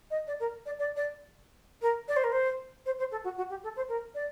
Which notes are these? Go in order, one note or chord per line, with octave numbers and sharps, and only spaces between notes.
D#5
D5
A#4
D5
D5
D5
A#4
D5
C5
A#4
C5
C5
C5
A4
F#4
F#4
G4
A4
C5
A#4
D5